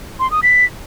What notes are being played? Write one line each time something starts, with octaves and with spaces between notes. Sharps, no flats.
C6
D#6
B6